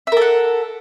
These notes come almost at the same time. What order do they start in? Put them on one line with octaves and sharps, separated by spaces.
E5 A#4 A4 F#5